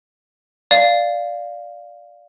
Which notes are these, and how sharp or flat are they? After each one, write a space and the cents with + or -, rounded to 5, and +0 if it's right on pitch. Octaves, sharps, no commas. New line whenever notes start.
D5 +0 F5 +0